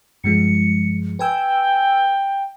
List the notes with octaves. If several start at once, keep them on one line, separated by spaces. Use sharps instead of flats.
G2 F3 G#3 C#7
B4 G5 G#5 E6